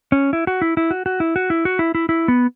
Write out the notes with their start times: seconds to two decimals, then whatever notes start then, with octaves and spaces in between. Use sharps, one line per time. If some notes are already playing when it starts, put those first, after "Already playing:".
0.12 C#4
0.33 E4
0.47 F#4
0.62 E4
0.77 E4
0.91 F#4
1.06 F#4
1.20 E4
1.36 F#4
1.50 E4
1.65 F#4
1.79 E4
1.95 E4
2.09 E4
2.28 B3